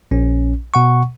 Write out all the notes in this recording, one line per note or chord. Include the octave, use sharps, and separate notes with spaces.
A#1 C#4
B2 F#5 C#6